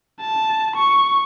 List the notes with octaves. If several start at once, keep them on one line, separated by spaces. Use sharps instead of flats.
A5
C#6